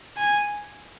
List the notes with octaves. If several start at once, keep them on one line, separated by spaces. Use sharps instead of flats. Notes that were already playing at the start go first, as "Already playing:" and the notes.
G#5